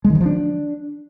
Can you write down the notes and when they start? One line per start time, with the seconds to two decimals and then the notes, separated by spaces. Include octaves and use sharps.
0.04 G#3
0.10 D#3
0.15 F#3
0.20 F3
0.26 D4